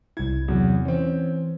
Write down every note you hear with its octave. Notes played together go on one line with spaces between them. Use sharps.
C2 E4 G#6
E2 C3 F#3
E3 C4 C#4